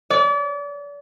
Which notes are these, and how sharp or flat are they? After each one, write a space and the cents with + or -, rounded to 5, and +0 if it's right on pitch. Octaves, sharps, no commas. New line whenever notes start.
D5 -35